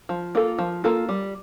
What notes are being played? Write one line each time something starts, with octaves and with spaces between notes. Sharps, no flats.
F3
A#3 F4 A4
F3
A#3 F4 A4
G3